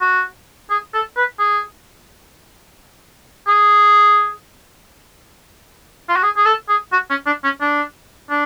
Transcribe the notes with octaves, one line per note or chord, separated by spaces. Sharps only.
F#4
G#4
A4
B4
G#4
G#4
F4
F#4
G#4
G#4
A4
G#4
F#4
C#4
D4
C#4
D4
D4